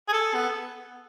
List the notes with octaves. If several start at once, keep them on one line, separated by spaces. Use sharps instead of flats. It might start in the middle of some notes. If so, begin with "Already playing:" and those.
G#4
A4
B3